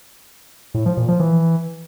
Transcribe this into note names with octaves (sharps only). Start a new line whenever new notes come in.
A2
F3
A#2
F3
E3